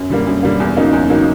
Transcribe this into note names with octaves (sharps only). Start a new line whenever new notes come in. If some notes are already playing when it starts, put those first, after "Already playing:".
Already playing: F#2
D3 G3 A#3
F#2
D3 G3 A#3
E2
C#3 F#3 A#3 D#4
E2
C#3 F#3 A#3 D#4